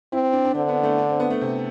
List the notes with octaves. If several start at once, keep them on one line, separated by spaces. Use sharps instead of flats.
C4 E4
D4
D4
D3 C4
B3
A3
D4
C4
B3
A3
C3